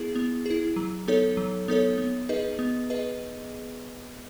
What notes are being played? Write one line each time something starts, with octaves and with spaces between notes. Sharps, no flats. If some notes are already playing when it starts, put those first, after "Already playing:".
Already playing: B3 E4 G#4
B3
E4 G#4
F#3
B3 D#4 A4 C#5
F#3
B3 D#4 A4 C#5
B3
D#4 G#4 B4 D#5
B3
G#4 B4 D#5